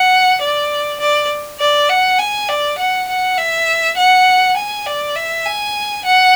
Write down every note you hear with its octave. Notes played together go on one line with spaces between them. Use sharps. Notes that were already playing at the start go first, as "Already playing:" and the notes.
Already playing: F#5
D5
D5
D5
F#5
G#5
D5
F#5
F#5
E5
F#5
G#5
D5
E5
G#5
F#5